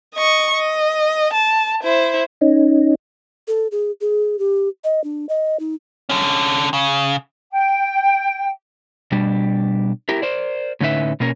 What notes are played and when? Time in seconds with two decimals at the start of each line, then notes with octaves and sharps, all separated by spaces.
0.15 D#5 C#6
0.54 D#5
1.33 A5
1.83 E4 C5
2.41 C#4 D#4
3.48 A4
3.72 G#4
4.01 G#4
4.39 G4
4.84 D#5
5.04 D4
5.29 D#5
5.60 D#4
6.09 D3 C#4
6.74 C#3
7.52 G5
9.12 B2 G3 D4
10.09 E4 G4 A#4
10.22 A#4 C5 D5
10.81 A2 D3 C#4 D#4 B4 E5
11.20 B2 A#3 C#4 A#4